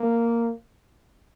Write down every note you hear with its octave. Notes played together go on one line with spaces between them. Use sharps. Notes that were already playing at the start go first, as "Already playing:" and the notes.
Already playing: A#3